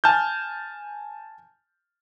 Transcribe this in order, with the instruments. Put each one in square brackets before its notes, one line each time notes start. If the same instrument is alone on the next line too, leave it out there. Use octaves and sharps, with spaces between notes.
[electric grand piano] G#5 A5 F6 G6